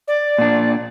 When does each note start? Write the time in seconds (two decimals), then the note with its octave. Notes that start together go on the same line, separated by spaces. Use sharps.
0.07 D5
0.38 A#2 D4